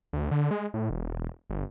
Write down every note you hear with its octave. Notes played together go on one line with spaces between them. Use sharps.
D2
D3
G#3
A2
E1
G1